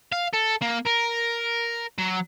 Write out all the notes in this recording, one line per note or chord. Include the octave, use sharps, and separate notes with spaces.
F5
A4
A#3
A#4
F#3